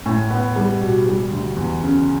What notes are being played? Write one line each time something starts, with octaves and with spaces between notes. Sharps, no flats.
A2
B3
G3
B2
G3
D2
E2
C#3